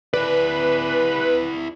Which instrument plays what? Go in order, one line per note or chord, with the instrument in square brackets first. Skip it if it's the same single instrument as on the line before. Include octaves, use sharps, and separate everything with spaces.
[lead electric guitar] E4 D5 [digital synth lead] B4